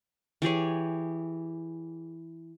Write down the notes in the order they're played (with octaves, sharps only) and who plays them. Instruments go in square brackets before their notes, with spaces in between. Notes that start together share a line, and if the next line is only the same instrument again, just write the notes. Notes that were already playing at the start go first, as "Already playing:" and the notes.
[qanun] E3 G4 G#4 C#5